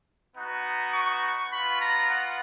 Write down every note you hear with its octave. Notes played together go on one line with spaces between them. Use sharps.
B3 D#4 F#4
C#6
B3 F4 B5
A#5
F#5